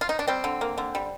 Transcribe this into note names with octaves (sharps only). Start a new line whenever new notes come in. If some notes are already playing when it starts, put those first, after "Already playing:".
F4
D#4
D4
G3 C4
D3
A#3
D3
G3